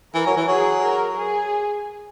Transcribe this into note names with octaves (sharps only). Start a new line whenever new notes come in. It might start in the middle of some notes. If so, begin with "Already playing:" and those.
E3 A#4
F#3
E3
F#3 G#4
A#4
G#4